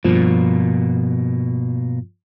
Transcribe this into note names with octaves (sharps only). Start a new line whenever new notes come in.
G2 B2 F3 A#3